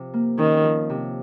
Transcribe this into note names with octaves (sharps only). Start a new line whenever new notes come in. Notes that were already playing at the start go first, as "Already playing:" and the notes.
Already playing: C3 F3
A#3
D#3 C#4
F3
C3